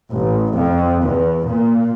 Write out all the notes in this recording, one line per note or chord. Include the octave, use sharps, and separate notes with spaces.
A1
F2
E2
A#2